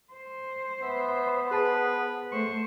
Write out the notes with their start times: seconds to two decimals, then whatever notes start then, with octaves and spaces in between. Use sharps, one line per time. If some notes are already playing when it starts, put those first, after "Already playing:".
0.13 C5
0.82 B3 E5
1.51 G#4 B4 A5
2.32 A3 C5 C#6